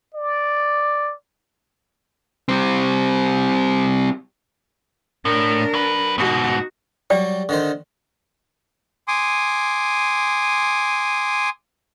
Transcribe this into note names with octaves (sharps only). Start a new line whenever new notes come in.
D5
G3 C4
A2 D4 A#4
F#3 B4
G#2 B2 D#4 F#4
F#3 G3 D5 G5
D3 D#3 C5
G#5 C6 D6 D#6